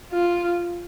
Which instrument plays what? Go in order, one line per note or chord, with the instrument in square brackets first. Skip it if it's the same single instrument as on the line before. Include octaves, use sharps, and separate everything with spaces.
[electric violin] F4